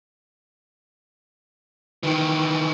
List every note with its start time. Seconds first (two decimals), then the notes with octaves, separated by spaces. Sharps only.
2.03 D#3 E3